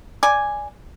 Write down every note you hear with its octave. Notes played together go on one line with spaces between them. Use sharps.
D5 G#5